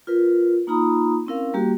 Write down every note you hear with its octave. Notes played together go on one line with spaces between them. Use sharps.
F4 A#4 B4
A#3 D#4 F4 A#5 B5 D#6
C4 C#4 E4 A#4 F5
G3 A#3 F#4 G4